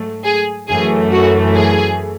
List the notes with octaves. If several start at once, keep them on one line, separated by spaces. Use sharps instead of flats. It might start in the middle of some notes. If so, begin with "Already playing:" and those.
Already playing: G#2 F#3 A3
G#4
F#2 E3 A3 G#4
F#4
G#4